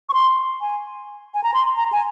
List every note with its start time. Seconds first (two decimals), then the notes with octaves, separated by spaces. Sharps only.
0.09 C#6
0.14 C6
0.61 G#5
1.34 G#5
1.44 A#5
1.54 C6
1.77 A#5
1.92 G#5